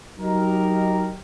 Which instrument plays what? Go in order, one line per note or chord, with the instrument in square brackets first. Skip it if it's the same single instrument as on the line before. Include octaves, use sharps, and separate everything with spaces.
[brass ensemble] F#3 D#4 G4 A#4